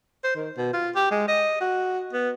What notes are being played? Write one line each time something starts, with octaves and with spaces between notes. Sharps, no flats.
C5
D#3
B2
F4
G4
G#3
D#5
F#4
B3